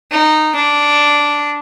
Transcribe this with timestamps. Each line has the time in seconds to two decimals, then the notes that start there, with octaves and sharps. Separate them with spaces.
0.12 D#4
0.56 D4